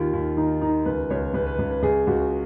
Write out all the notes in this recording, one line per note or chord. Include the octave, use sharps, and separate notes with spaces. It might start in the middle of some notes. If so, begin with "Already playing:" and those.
Already playing: D#2 F4
D#2
D#3 D#4
D#3 D#4
C#2 B4
C#2 C#5
C#2 B4
B4
C#2
B4
C#2 G#4
C#2 F#4